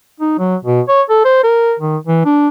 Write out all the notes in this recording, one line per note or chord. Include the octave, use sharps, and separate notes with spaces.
D#4
F#3
B2
C#5
A4
C5
A#4
D#3
E3
D4